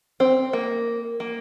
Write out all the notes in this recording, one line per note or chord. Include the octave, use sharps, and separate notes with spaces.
C4
A#3
A#3